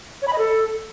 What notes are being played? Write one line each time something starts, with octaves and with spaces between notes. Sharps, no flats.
C#5
B5
D#5
A4